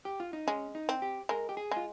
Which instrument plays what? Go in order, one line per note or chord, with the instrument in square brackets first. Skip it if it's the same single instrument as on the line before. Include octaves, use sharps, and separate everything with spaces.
[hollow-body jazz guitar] G4
F4
D#4
[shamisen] G#3 [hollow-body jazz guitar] C#4
[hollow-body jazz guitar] D#4
[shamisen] C4
[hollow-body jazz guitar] G4
[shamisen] G#3 [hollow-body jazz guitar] A#4
[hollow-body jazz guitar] G4
G#4
[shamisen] G#3 [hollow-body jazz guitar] F4